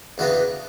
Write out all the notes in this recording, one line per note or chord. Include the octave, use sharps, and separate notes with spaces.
E2 C#3 E3 B3 D4 F#4